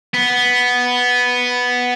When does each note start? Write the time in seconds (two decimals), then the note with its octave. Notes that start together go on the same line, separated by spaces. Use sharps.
0.14 B3